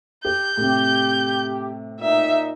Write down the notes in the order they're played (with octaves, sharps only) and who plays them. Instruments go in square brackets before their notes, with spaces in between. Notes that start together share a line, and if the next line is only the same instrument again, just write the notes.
[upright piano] G4 [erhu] G6
[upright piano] A2 C3 [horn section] G4
[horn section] A#2 D#4 [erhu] E5